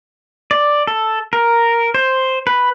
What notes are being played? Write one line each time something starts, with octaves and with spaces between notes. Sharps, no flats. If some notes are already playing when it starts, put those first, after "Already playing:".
D5
A4
A#4
C5
B4